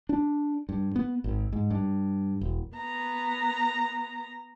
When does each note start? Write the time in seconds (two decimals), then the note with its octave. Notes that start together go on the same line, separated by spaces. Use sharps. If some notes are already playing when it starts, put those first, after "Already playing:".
0.09 D4
0.69 G2
0.96 B3
1.24 G#1
1.52 G#2
1.70 G2
2.41 E1
2.76 B3 A#5